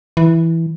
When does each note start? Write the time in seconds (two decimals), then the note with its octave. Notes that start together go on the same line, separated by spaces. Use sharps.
0.17 E3